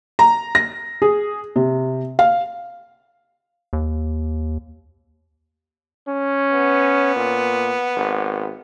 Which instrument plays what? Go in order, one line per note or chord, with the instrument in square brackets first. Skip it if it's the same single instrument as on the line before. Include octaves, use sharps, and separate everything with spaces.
[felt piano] A#5
A#6
G#4
C3
F5
[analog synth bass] D#2
[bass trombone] C#4
[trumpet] B3
[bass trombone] A#2
G#1